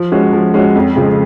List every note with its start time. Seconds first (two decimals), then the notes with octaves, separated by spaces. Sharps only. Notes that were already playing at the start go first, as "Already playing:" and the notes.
Already playing: F3
0.12 G#3 C#4 F#4
0.33 F3
0.54 G#3 C#4 F#4
0.75 F2
0.96 C#3 F3 G#3